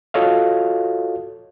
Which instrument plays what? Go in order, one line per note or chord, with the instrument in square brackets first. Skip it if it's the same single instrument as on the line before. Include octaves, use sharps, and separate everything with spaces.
[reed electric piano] F4 F#4 A4 C#5 D#5 F5